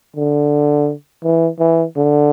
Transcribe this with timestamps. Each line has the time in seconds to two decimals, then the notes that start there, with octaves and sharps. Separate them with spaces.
0.16 D3
1.24 E3
1.59 E3
1.96 D3